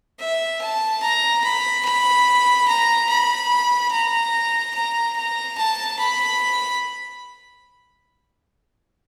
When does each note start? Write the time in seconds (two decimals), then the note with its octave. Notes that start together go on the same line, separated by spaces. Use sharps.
0.20 E5
0.61 A5
1.02 A#5
1.44 B5
1.84 B5
2.67 A#5
3.09 B5
3.91 A#5
4.74 A#5
5.16 A#5
5.57 A5
5.99 B5